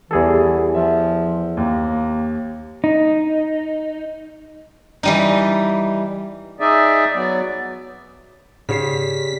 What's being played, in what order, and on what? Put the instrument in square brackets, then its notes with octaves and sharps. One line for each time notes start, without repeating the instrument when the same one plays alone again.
[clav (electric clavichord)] E2 G#4 A4 [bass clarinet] E3 [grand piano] G3
[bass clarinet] F3 [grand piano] E5
[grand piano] D#2 [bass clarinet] A#3
[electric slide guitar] D#4
[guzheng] E3 G3 D#4
[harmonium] D#4 G#4 D5 E5
F#3 B3 D5
[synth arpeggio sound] G#2 C7 [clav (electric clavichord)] C#3 [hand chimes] G4 D5 [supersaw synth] B6